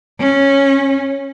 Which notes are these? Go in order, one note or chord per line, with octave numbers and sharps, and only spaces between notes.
C#4